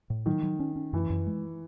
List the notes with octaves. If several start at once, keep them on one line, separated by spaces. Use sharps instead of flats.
A2
D#3 F#3
F#3
C#4
C#4
F#2 E3
F#2
G#3